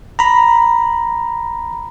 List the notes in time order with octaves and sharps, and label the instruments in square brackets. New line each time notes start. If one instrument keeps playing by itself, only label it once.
[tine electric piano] A#5 B5